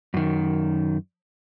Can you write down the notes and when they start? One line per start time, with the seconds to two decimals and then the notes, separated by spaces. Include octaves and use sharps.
0.14 F#2 D#3